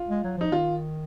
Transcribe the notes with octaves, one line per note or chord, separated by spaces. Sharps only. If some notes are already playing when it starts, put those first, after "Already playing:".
Already playing: F4
G#3
F#3
F3 D#4
D#3 F4